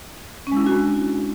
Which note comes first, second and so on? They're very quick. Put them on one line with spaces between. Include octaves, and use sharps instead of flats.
C#4 G#3 E4 D4 F#4